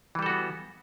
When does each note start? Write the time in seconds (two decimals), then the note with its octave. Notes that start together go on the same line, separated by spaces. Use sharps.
0.15 E3
0.19 G3
0.22 A4
0.26 F#4
0.30 B3